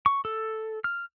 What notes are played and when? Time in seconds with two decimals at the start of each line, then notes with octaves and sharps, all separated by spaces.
0.06 C#6
0.25 A4
0.84 F6